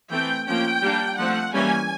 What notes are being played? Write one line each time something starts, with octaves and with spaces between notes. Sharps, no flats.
E3 A3 C4 G5
F3 A#3 C#4 G5
G3 A#3 D4
F3 A3 C4 F#5
E3 G3 A#3 C#4 G#5